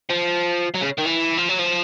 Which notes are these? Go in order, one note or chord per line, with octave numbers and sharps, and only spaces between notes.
F3
F#3
C#3
D#3
E3
F3
F#3
F3